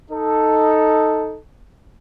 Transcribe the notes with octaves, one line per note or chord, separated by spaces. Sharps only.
D#4 A4